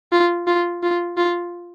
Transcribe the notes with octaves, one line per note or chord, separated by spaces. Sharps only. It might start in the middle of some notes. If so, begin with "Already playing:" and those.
F4
F4
F4
F4